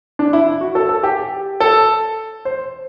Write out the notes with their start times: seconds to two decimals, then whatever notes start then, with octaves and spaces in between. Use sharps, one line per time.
0.19 D4
0.33 E4
0.61 F#4
0.75 A4
0.89 A4
1.03 G4
1.60 A4
2.45 C5